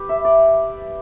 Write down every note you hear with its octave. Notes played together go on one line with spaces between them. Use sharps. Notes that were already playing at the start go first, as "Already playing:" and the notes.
Already playing: G4 B4
E5
D5